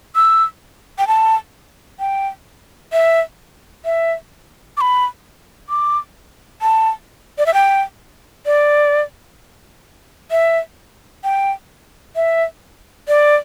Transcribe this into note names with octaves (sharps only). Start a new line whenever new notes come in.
E6
G5
A5
G5
E5
E5
D6
B5
D6
A5
D5
E5
G5
D5
E5
G5
E5
D5